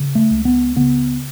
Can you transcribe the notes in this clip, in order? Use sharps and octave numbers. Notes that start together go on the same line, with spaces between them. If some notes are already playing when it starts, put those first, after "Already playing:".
Already playing: C#3
A3
C#2
B3
C#3 B3